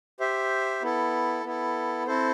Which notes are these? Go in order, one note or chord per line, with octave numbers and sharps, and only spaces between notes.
G4 C5 E5
B3 E4 A4
B3 E4 A4
C4 E4 A4 C5